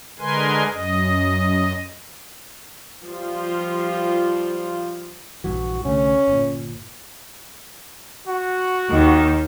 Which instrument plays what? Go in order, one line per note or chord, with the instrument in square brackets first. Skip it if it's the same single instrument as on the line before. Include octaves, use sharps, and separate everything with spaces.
[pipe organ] D3 G#3 A#4 B4 G#5 C6
F#2 D#5
[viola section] F3 G3 F4
[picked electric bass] A#1 G2 E3 [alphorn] F#4
[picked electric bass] C2 D3 A3 [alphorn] C#4
[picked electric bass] G1 A#2
[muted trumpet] F#4
[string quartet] D#2 D#3